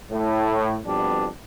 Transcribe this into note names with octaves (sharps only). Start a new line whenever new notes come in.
A2
F2 B2 G3 B3 D4